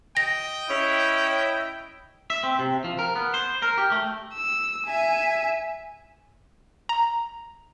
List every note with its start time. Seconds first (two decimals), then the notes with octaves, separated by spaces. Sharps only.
0.17 D#5 G5 A#6
0.70 C#4 E4
2.30 E5
2.43 C4
2.59 C3
2.84 F3
2.99 A#4
3.16 B3
3.34 C5
3.62 A#4
3.78 G4
3.92 A3
4.34 E6
4.86 E5 G#5
6.89 A#5